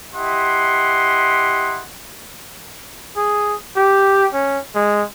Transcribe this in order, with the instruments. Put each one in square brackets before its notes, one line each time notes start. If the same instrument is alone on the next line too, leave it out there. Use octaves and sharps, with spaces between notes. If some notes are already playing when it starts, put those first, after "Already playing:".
[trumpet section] E4 G4 D#5 F#5 C6
[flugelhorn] G#4
G4
C#4
G#3